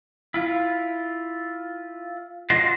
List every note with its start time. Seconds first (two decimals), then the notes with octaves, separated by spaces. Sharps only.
0.34 E4 F4
2.50 D4 F4 F#4 C5 D5 D#5